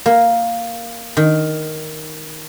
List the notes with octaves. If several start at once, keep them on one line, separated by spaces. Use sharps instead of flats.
A#3
D#3